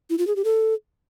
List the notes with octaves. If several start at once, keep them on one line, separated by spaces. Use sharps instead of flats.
E4
F4
G#4
G4
A4